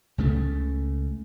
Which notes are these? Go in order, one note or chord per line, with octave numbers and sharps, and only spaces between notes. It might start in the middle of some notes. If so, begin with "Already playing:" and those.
C#2 C#3 A3